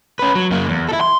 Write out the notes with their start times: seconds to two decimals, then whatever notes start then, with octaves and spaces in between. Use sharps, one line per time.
0.19 C#4 B4
0.35 F#3
0.51 F#2 A#3
0.69 E2
0.89 E4 A4
1.01 C6